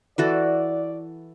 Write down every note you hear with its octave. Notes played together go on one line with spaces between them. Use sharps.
E3 F#4 A4 D5